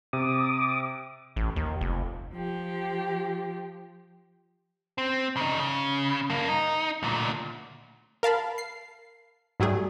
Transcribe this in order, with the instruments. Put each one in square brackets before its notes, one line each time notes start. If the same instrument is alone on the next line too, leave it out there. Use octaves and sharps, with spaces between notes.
[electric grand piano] C3 [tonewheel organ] D6 D#6
[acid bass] A1
D#2
F1
[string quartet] F3 G4
[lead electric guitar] C4
C#3 D#4
C#3
G2 A#3
D#4
D2 A#2
[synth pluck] A#4 F5 A5 B5
C7
G#2 F#3 G3 A3 G#4